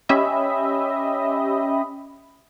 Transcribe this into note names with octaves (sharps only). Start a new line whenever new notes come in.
C#4 G4 D#5 E5 B5